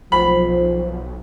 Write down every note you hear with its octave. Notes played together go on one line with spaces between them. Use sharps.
B1 F3 C5 B5